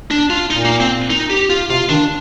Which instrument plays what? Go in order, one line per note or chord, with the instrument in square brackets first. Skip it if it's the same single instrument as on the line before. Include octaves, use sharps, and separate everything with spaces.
[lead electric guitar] D4
F4
[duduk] A#2 [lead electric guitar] D#4
[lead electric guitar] A#3
C4
D#4
G4
F4
[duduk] C3 [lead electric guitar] F4
[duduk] D#3 [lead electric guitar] D4